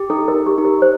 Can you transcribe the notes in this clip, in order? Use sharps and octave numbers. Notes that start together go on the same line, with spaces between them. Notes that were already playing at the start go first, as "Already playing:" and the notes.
Already playing: G4
D#4 A4
A#4
D#4
G4
D#4
A#4
C5